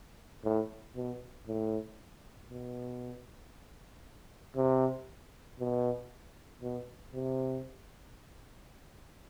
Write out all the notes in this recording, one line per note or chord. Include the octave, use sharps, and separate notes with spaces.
A2
B2
A2
B2
C3
B2
B2
C3